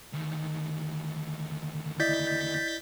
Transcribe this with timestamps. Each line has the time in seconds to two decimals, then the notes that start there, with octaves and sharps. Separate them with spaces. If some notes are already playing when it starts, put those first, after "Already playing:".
0.14 D2 D#3
2.00 E4 D5 D#5 G6 A6 B6